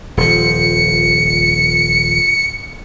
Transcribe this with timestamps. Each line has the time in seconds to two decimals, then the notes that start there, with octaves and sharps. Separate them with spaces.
0.17 D#1 F3 C#7